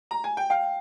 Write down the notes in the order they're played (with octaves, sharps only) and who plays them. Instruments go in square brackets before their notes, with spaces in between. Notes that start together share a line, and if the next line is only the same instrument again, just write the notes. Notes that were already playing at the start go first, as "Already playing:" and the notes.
[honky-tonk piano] A#5
G#5
G5
[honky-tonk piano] F5 [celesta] G5